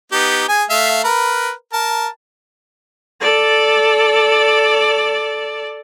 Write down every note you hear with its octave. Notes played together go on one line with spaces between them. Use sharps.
B3 D#4 G4
G#4 G#5
A3 E5 F5
A#4 B4
A#4 A5
A4 D5